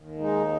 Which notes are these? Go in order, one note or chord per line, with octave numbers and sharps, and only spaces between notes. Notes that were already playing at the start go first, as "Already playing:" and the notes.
Already playing: D#2
G#3 D#4